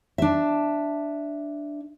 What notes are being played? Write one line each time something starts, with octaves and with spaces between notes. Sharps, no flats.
D4 E5